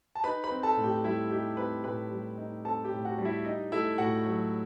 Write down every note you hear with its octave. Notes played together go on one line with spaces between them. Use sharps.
A5
D#4 B4 B5
B4 B5
C4
A4 A5
A2
G4 G5
G3 E4 E5
D#4 G4 G5
C4 B4 B5
A2 B4 B5
G3
D#4
C4 A4 A5
G4 G5
A2
F#4 F#5
G3
E4 E5
D#4 D#5
A3 E4 E5
A2 F#4 F#5
F#3